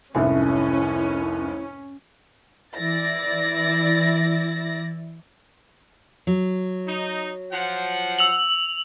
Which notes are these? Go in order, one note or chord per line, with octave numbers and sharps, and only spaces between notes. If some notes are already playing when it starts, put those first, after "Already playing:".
F1 C2 G#2 C#4 E4 E5 G#5
E3 E4 D5 A6 A#6
F#3
D#4
F3 F#5
E6 F7 F#7